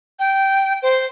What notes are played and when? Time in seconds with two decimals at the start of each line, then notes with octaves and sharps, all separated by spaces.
0.19 G5
0.83 C5